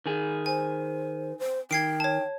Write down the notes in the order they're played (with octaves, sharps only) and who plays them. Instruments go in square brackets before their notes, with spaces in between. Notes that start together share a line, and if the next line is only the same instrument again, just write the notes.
[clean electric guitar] D#3 G#4
[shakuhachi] C5 [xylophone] G#5
[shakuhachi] C5
[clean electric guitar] D#3 [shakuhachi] G5 [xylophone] G#6 C7 D7
[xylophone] C#5 A5